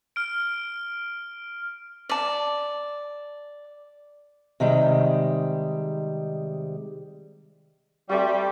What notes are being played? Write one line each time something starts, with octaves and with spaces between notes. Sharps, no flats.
F6 D7
D5 A5
C3 D#3 G3 G#3
G3 A3 C4 F#4